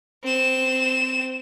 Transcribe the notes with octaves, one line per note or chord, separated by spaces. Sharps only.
C4 E7